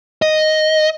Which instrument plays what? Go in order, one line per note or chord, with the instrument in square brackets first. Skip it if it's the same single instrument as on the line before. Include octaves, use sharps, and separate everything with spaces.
[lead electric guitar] D#5